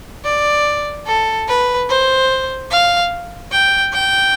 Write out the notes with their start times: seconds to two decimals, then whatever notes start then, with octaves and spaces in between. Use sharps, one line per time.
0.24 D5
1.06 A4
1.48 B4
1.89 C5
2.71 F5
3.52 G5
3.93 G5